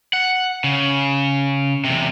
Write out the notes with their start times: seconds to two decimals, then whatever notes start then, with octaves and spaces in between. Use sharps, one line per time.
0.13 F#5
0.64 C#3
1.85 E2 C3